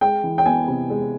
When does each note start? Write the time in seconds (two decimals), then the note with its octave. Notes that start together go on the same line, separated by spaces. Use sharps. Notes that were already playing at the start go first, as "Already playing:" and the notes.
0.01 G#3 G5
0.24 E3
0.38 G5
0.46 B3 G#5
0.68 C3
0.90 G#3